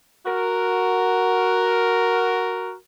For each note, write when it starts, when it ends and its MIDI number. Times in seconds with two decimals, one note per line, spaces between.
0.25 2.74 66
0.25 2.74 70